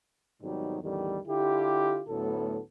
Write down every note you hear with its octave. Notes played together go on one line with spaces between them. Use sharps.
G#1 G#2 B2 F#3 G3 D#4
A1 E2 D3 D#3 G3
D3 E4 F4 G4
D2 A2 F#3 B3 A4